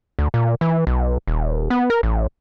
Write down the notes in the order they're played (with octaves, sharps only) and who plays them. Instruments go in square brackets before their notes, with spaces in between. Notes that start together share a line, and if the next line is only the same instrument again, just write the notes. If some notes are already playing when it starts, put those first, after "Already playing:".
[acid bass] D2
A#2
E3
B1
D#1
B3
A#4
A1